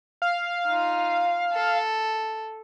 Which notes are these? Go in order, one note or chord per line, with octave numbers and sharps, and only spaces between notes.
F5
D#4 F4
A4